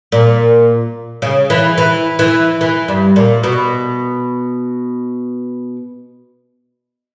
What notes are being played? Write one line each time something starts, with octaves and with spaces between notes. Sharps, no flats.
A#2
C#3
E3
E3
E3
E3
G2
A#2
B2